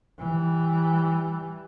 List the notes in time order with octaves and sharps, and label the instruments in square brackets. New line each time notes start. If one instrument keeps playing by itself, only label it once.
[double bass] E3 G3